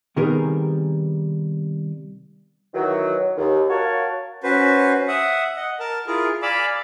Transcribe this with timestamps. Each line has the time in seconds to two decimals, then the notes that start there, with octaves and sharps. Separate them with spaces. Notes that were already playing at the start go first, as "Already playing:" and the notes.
0.16 C3 D#3 G3 B3 G#4 A#4
2.74 D#3 E3 F#3
3.36 D#2
3.69 F#4 A#4 C#5 F5 A5
4.43 C#4 F#4 B4 C5
5.08 E5 F#5 D#6
5.56 D#5 F#5
5.80 A#4 A5
6.07 E4 F4 G#4 A#4
6.42 D5 F5 G#5 B5 D6 E6